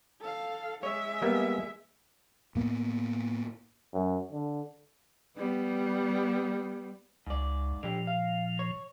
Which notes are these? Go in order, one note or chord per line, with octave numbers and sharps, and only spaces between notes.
A4 F5
G#3 C#5 E5
G3 A#3 B3
A2 A#3 B3
F#2
D3
G3 B3
C#2 G#2 D5
A#2 D3 F3 G3 G4
F5
C#5